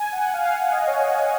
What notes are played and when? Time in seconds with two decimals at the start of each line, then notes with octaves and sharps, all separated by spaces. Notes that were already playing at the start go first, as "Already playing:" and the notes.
Already playing: G#5
0.12 F#5
0.33 F5
0.49 F#5
0.56 F5
0.71 D#5
0.87 C#5
1.02 C#5